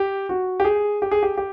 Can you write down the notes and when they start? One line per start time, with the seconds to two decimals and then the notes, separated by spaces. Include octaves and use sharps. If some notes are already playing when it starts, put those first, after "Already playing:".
Already playing: G4
0.29 F#4
0.60 G4
0.65 G#4
1.02 G4
1.11 G#4
1.23 G4
1.38 G4